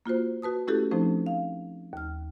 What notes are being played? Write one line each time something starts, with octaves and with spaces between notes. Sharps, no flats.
A#3 F4 F#4 C5
F#4 B4 A5 D#6
A3 C#4 E4 F#4 G4 A4
F3 A3 C4 C#4 D#4 C5
F5
D#2 F6